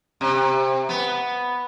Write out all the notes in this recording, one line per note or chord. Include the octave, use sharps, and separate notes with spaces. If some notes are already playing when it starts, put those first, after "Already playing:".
C3
B3